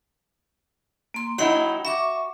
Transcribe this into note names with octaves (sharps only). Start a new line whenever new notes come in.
A#3 C6
F#3 D#4 E4 F#5 G5 B5
F#4 E5 C#6 D6